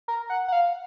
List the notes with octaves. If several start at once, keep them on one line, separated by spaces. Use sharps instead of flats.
A#4
F#5
F#5
F5